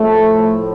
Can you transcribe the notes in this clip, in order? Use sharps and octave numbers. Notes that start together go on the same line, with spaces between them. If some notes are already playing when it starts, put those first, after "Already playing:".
Already playing: A2 F3 A3